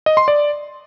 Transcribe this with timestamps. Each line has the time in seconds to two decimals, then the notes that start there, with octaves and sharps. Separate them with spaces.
0.06 D#5
0.17 C6
0.28 D5